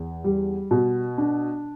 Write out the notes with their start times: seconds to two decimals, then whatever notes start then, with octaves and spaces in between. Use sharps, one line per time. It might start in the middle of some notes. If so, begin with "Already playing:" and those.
Already playing: E2
0.24 G3
0.71 B2
1.18 D4